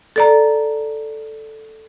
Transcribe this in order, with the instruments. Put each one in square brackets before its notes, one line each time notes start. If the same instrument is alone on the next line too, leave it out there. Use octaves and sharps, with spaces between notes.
[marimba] A4 D5 A#5